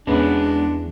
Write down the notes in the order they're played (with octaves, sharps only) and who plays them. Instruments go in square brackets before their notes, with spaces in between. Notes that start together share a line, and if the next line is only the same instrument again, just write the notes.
[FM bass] E2 [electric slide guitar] G#3 B3 [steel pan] C#4 B4 [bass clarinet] D4